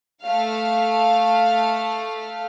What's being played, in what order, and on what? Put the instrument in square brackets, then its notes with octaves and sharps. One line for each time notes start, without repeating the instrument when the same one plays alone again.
[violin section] A3 F5